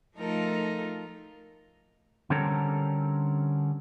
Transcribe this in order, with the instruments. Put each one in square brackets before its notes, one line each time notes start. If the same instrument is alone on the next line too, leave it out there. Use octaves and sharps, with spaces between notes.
[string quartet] F3 A3 D#4 F4 A4 A#4
[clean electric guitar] D3 G3 C4 C#4 A4 A#4